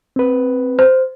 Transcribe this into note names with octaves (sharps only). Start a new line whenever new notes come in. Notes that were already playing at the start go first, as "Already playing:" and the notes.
C4 B4
C5